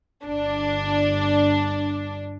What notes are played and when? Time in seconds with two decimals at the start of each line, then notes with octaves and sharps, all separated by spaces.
0.25 G1 D4